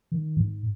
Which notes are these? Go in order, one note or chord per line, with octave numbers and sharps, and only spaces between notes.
D#3
G#2